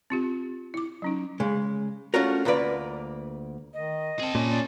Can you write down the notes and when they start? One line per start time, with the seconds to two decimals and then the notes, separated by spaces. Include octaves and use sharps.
0.10 C4 F4 G4
0.74 E4 D6
1.02 F#3 C#4 D#4
1.40 C#3 G#3
2.14 A3 C#4 D4 F4 F#4 A#4
2.45 D2 A#3 F4 B4 D5
3.74 D#3 D#5
4.19 C4 G#4 A5
4.35 A#2 C#4
4.49 D5